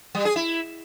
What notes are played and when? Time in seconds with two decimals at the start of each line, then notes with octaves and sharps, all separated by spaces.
0.15 G3
0.25 G#4
0.36 E4